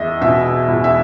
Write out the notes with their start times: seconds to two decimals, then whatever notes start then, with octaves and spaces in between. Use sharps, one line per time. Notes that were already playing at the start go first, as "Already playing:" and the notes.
Already playing: E2 D#5 E5
0.21 B2 E5
0.68 E2
0.84 E5